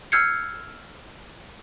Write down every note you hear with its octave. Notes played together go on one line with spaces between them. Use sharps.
E6 F6 G6 G#6 C7 C#7